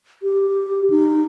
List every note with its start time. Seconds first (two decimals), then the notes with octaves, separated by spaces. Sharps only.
0.23 G4
0.90 D#4